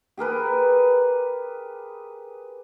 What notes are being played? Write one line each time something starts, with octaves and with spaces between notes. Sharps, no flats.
G4 G#4 A#4 B4